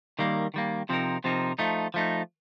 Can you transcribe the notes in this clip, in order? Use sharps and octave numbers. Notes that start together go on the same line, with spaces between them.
D#3 G3 A#3
D#3 G3 A#3
C3 F3 C4 D#4 A#4
C3 F3 C4 D#4 A#4
F3 A3 D#4
F3 A3 D#4